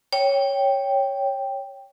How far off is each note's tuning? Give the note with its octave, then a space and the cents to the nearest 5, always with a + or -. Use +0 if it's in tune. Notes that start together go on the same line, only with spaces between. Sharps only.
C#5 +0 G5 +0